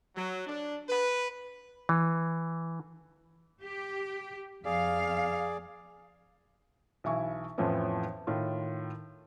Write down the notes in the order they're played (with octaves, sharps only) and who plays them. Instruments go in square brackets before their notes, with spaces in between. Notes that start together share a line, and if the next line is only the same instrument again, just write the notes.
[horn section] F#3
D4
B4
[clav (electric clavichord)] E3
[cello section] G4
[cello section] F2 F5 [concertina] G#4 D5
[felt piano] B1 E3 E4 G#5 C#6
F2 A2 E3 F3 B3 C#4
A2 D#3 F4